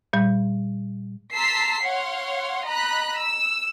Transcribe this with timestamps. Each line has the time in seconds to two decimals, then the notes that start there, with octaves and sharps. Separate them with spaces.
0.13 A#2 G3
1.33 A5 A#5 C6 E6 B6 C7
1.84 C#5 F5 F#5 C6
2.66 D#5 A#5 B5 F#6
3.17 E6